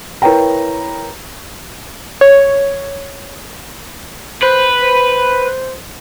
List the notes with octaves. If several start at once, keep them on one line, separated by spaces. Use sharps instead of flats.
E4 A#4 B4 C#5 G5 A#5
C#5
B4 C5
C5